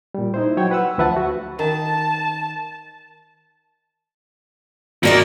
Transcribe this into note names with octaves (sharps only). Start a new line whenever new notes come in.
A#2 G3
D#4 E4 C5
F#3 C#5 G5 G#6
B4 F#5 E6
D2 F3 B4 E5 F#5 A5
F#4
D#3 A5
D#2 A#3 F#4 D5 D#5